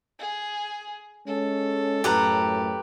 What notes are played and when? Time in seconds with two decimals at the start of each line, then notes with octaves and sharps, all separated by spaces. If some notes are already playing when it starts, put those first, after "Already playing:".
0.19 G#4
1.27 G#3 C#4 A4
2.04 F#2 A2 G4 B4 A#5